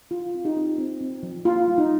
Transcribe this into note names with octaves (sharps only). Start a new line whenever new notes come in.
F3 F4
C4
D#4 G4
C4
C4
C4
F3
A#3 F4
G3
D#4